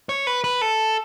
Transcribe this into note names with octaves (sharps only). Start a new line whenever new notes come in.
C#5
B4
B4
A4